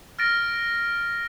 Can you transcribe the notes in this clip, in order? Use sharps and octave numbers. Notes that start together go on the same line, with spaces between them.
F6 A6 A#6 D7